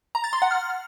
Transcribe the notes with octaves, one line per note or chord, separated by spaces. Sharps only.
A#5
A6
C6
F#5
F6